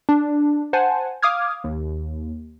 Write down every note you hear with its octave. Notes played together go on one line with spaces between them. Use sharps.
D4
C5 F#5 G#5 A5
F5 D6 D#6 F6 G#6
D#2